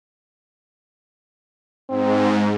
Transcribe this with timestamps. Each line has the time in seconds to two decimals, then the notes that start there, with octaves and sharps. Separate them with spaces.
1.89 G#2 C4